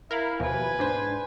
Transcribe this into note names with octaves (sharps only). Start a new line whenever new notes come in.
E4 A#4 F5 B5
D#2 B2 F3 B4 G#5
G#2 D4 C5